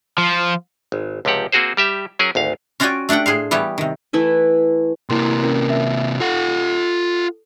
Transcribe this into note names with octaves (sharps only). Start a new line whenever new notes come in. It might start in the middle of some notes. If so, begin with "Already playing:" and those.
F3
G#1
C#2 C3 F3 G4 F#5
A#3 C4 F#4 G#4 C5
G3 G4 E5
F#3 C#4 G#4 A#4
G#1 D2 F5
C#4 F4 F#4 D5 G5 G#5
A3 D4 G4 F#5 G5
A2 G#4 C5 F5
E3 G3 B3 G4 C#5
C3 D#3
E3 A3 E4 B4
C3 A#3 E4 A#4 C6
C#4 A#4
E5
F4 A4 F#5